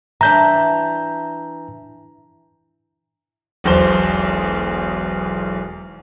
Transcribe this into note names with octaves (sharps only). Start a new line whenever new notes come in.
E3 D4 A#5 G6
E1 B1 E2 C5 G7